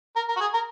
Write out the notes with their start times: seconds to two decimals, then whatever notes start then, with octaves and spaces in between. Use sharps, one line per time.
0.16 A#4
0.29 A#4
0.36 F#4
0.41 G#4
0.54 A#4